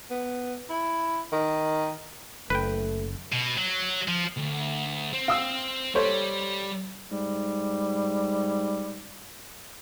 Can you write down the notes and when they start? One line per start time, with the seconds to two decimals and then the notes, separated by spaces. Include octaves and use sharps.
0.10 B3
0.70 E4
1.32 D#3
2.50 F#1 A3 B4 G5
3.32 B2
3.58 F#3
4.08 F3
4.37 D2
5.13 C4
5.28 F5 D#6 E6
5.95 G3 A4 C5 C#5
7.11 G#2 G3